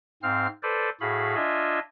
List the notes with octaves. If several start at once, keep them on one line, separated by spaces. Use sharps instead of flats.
G#2 C4 F5 F6
A4 B4 C5 D5
A2 F#4 G#4 F5 B5
D4 F4 D#5 E5 G#5